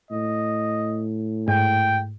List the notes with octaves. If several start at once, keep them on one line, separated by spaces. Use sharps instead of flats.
A2 D#5
G#2 G5